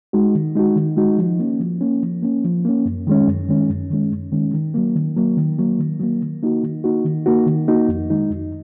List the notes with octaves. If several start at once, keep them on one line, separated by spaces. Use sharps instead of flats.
G#3 D#4 F#4
D#3
G#3 D#4 F#4
D#3
G#3 D#4 F#4
F3
A#3 C#4
F3
A#3 C#4
F3
A#3 C#4
F3
A#3 C#4
F#2
D#3 G#3 C#4
F#2
D#3 G#3 C#4
F#2
D#3 G#3 C#4
F#2
D#3 G#3 C#4
D#3
F#3 A#3
D#3
F#3 A#3
D#3
F#3 A#3
D#3
F#3 A#3
D#3
A#3 D#4 F#4
D#3
A#3 D#4 F#4
D#3
A#3 D#4 F#4
D#3
A#3 D#4 F#4
F2
D#3 G#3 D#4
F2